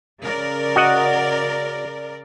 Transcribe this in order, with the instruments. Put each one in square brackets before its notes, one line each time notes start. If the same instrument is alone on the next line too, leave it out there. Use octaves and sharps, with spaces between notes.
[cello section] C#3 A#4 D5
[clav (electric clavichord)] F#4 D#5 F#5